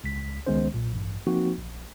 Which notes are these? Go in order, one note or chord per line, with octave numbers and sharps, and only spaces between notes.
C#2 B6
C#2 D#3 G#3 B3 C#4 C5
B1 A#2
A1 G2
F3 A#3 C4 D#4 F#4
A#1